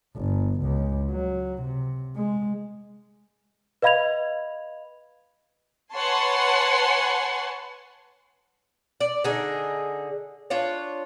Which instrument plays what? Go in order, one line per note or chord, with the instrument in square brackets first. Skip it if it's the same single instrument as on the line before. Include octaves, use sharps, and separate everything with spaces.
[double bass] G1
C#2
F#3
C3
G#3
[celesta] B4 D#5 F5 B5 G#6 F7
[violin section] B4 C#5 F#5 G#5 A5 C6
[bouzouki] D5
D3 D#4 G#4
D4 F4 C#5